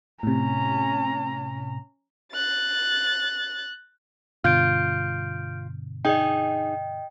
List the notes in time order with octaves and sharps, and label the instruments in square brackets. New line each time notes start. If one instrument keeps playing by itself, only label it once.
[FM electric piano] A2 C3 [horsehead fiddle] C#4 A#5
[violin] F#6 A6
[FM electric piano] G2 B2 D3 [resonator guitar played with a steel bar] F4 [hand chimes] F6 G6 D7
[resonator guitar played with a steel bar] D#4 G#4 [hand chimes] D#5 G5